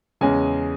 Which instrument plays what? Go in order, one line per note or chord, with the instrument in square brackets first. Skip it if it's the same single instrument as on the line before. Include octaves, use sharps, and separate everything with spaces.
[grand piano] E2 C#3 G#3 C#4 G#5